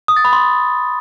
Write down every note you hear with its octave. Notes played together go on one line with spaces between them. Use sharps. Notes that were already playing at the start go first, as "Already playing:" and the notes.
D#6
A6
B5
C6